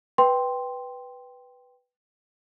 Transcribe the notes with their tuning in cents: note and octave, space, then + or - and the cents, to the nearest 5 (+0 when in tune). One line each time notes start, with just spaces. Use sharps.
B4 +0 G5 +0 C6 +0